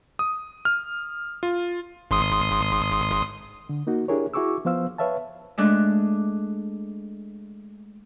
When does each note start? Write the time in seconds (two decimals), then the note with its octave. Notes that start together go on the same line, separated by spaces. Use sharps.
0.19 D#6
0.65 F6
1.43 F4
2.11 G#1 C6 D#6
3.69 D3
3.87 A#3 D#4 F#4
4.08 D4 E4 G4 G#4 A#4 C#5
4.34 E4 F#4 G#4 C#6 D6 E6
4.65 F3 B3 C5 F5 E6
4.98 B4 C#5 E5 F5 A5
5.58 G#3 A3 D4 F#6